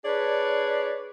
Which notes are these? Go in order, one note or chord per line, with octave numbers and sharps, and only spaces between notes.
D4 G#4 B4 C#5 D5